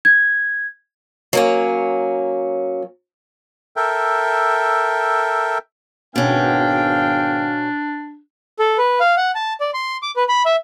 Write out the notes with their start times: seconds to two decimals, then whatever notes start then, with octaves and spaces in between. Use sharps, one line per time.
0.05 G#6
1.33 F#3 A#3 C#4
3.76 A4 A#4 E5 G5
6.16 G#1 B2 B3 C#4 D4 F5 G5
8.59 A4
8.78 B4
9.00 F5
9.17 F#5
9.35 A5
9.61 D5
9.74 C6
10.02 D6
10.16 B4
10.29 B5
10.46 E5